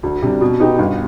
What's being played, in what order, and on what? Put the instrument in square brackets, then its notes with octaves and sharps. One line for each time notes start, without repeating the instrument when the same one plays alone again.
[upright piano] D2
C3 G3 D4
B2
B3 D#4 G4
G1